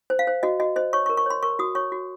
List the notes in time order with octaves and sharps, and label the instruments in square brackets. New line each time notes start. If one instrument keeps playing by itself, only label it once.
[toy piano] C5
F5
C5
F#4 D#5
F#4 D#5
C5 D#5
C#5 C#6
C#6
A#4
C#6
C#5 C6
A#4 C#6
F#4 D#6
C#5 C#6
F#4